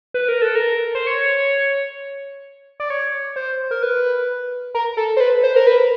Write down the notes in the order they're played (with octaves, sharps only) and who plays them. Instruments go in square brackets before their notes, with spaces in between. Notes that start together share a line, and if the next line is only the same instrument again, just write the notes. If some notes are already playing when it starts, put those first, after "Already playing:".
[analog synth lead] B4
A#4
A4
A#4
C5
C#5
D5
C#5
C5
A#4
B4
A#4
A4
C5
B4
C5
A#4
B4